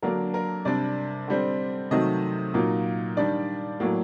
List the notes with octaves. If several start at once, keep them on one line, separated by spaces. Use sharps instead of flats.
D3 F#3 A#3 D4 A#4
A#4
C3 G3 D4 D5
D3 G3 C4
C3 D#3 F#3 A3 D#5
A#2 F#3 A#3 D#4
D#3 G3 D4 D5
A2 F#3 A#3